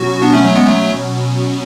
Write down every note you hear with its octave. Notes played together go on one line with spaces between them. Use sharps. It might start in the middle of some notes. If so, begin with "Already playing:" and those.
Already playing: B2 F#3 C#4 F#4
B3 D4
A3 C#4
F#3 A3
G#3 B3
F#3 A3